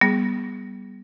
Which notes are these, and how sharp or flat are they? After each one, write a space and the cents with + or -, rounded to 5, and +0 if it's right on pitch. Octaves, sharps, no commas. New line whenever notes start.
G3 +0 B3 -15 G#4 +0